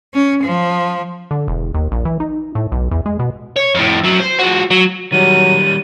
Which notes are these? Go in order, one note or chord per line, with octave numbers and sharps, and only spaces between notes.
C#4
F3
D3
E1
D#2
A#1
E3
D#4
A2
B1
E2
G#3
B2
C#5
F2 A2
F#2 F#3
C5
F3 F#4
F#3
D#3 F#3 G3 D#7